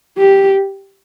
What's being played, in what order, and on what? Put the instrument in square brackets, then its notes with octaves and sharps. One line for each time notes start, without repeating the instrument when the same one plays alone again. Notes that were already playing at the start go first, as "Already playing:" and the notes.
[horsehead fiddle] G4